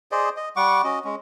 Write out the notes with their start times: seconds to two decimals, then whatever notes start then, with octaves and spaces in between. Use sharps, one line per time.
0.12 G#4 C5 D5 D#5
0.37 D#5
0.56 G3 F#5 C#6 D6
0.84 C#4 F#4 D#5
1.04 G#3 C#4